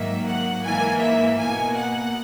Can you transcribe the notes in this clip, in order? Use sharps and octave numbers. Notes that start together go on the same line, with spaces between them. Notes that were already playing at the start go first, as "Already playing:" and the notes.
Already playing: G#2 D#3 F#3 A#3 E5
F#5
G#2 E3 A#3 G#5
E5
B2 A#3 G#5
F#5